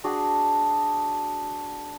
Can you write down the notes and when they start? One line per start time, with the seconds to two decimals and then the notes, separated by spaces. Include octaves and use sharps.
0.04 D4 F#4 G#4